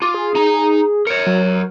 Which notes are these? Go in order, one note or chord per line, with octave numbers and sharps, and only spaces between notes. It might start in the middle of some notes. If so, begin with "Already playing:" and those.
F4 D6
G#4
D#4 A#5
A#4 C#5 C#7
F#3